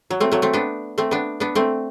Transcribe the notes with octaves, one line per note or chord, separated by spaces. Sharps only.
F#3
A3 C4
F#3 A3
A3 C4
B3 D4
A3 C4
B3 D4
B3 D4
A3 C4